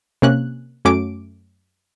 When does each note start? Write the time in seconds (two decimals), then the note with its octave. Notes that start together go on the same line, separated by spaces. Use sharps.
0.22 C3 A#3 C#4 F#6
0.85 F#2 F#3 A3 C#4 D6 D7